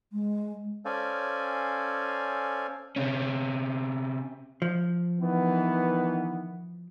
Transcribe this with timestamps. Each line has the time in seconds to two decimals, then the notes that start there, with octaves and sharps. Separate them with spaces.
0.13 G#3
0.85 C#4 A4 C5 D5 F5 G#5
2.96 C3 C#4
4.62 F3
5.20 D#3 E3 B3